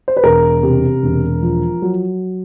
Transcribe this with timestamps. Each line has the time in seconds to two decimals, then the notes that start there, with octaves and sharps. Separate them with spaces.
0.08 C5
0.17 B4
0.24 E1 A#4
0.63 C3
1.03 E1
1.42 F3
1.82 F#3